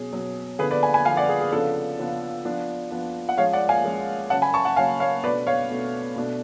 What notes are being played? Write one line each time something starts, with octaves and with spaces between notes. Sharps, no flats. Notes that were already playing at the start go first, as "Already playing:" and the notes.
Already playing: B2 F#3 C#4 G#4
B2 F#3 C#4
D3 F3 B3 G#4 B4
B4 D5
G#5 B5
G#5 B5
D3 F3 B3 F5 G#5
D5 F#5
G#4
G#4
C#3 F3 B3 D4 A4
C#3 F3 B3 D4
F3 B3 D4
F3 B3 D4
F#5
F3 G#3 C#4 C#5 F5
D5 F#5
F5 G#5
F3 G#3 C#4
C#3 F#3 C#4 F#5 A5
G#5 B5
A5 C#6
F#5 A5
C#3 F#3 C#4 F5 G#5
C#5 F5
B2 A3 D4 B4 D5
C#5 F5
B2 A3 D4
B2 A3 D4